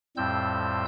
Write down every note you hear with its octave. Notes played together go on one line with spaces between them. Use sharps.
F2 A2 G3 C4 E6 G6